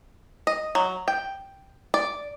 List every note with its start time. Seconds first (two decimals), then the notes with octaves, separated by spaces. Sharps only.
0.47 D#5
0.75 F#3
1.08 G5
1.94 D5